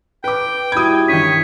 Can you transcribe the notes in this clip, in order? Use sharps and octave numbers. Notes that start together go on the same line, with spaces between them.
B4 G5 D6
G3 D#4 E4 F#4 B5 D#6 G#6
G2 D#3 C#5 B6 D#7